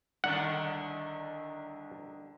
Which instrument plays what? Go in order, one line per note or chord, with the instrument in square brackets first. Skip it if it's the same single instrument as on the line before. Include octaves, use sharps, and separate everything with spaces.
[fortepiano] C2 D5 F#6 [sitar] D3 D#3 [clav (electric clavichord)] F#5